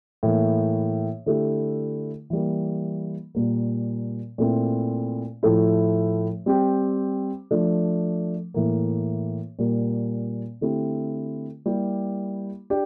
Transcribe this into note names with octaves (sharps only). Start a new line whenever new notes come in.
A2 E3 A#3
D3 A3 E4 G4
E3 G3 A#3
A#2 G3 A#3
A#2 A3 C4 E4
A2 F3 A3 E4
G3 C4 G4
F3 A3 D4
A2 E3 A#3
A#2 G3 A#3
D3 A3 C4 E4 G4
G3 A#3 E4 G4
D4 G4